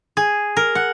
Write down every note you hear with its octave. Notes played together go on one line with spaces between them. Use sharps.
G#4
A#4
F#5